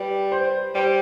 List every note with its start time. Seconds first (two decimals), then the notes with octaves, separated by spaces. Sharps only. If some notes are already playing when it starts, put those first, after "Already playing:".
Already playing: G3 B4
0.32 C5
0.75 G3 C5